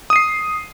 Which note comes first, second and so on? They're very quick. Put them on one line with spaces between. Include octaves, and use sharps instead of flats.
D#6 D#7 C7